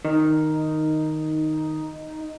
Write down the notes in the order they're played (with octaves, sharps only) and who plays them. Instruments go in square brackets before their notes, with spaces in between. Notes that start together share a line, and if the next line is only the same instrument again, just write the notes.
[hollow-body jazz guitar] D#3 [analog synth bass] D#4